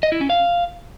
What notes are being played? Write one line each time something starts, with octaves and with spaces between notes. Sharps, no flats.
D#5
E4
C#4
F5